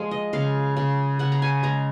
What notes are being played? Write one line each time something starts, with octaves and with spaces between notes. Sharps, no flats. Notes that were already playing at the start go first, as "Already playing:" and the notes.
Already playing: F3 G#3 F5
D#5
C#3 F5
C#3
C#3 F#5
A#5
G#5
G#3 A#5